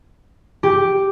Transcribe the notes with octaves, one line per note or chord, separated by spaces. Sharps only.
G4